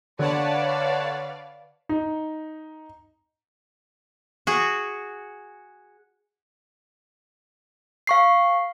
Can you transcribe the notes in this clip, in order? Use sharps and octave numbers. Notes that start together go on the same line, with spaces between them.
D3 B4 C#5 D5 F5 F#5 A5
D#4
F#4 G#4
F5 C#6 C7